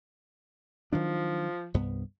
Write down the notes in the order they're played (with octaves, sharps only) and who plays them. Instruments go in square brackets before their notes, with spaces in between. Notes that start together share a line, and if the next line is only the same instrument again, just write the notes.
[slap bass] D#3 F#3 D4 [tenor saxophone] F3
[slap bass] C2 G2 B3